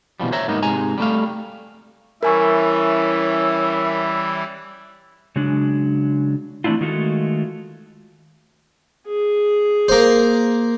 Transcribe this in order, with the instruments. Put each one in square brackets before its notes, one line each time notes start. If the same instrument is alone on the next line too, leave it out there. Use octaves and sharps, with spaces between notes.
[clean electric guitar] B2 E3 F3 G3
C5 C#5 E5 A#5
G#2 A#3 B3 D#4
G#2 C3 G#5 A#5
G3 A3 F5
[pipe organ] E3 G3 E4 [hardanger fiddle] C#4 [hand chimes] A#4 G#5 C#6 [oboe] E5
[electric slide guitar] C#3 F#3 G#3 D4
E3 A3 C4 D4 E4 F4
D#3 G#3 A3 F4 F#4 A4
[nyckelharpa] G#4
[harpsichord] A#3 C5